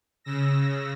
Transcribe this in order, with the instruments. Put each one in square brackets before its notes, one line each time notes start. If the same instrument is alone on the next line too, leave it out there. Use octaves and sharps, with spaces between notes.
[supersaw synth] C#3 E6 A#6